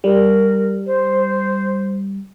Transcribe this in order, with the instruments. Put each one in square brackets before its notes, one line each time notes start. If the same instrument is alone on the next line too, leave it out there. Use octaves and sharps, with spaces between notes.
[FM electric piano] G3 [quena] A#4
[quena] C5